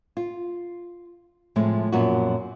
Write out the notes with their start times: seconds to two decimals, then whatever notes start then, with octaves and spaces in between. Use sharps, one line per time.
0.17 F4
1.56 A2 C3 F3 G#3 A3
1.92 F#2 A#2 F3 B3 F#4